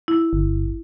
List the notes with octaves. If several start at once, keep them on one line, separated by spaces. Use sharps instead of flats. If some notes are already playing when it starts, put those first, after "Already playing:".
E4
G1